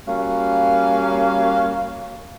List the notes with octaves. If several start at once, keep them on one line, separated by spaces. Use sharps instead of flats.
G3 A#3 C#4 F#4 F5